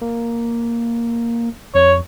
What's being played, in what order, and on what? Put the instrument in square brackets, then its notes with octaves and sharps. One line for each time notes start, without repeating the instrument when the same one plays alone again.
[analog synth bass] A#3
[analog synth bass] F2 [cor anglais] C#5